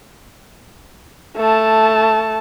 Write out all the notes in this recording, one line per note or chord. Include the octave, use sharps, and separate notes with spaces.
A3 A5